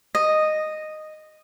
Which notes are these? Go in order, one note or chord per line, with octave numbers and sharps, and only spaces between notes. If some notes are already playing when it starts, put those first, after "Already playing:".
D#5